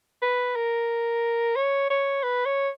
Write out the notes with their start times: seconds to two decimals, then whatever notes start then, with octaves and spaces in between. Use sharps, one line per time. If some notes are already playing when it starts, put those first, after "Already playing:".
0.22 B4
0.56 A#4
1.56 C#5
1.90 C#5
2.23 B4
2.45 C#5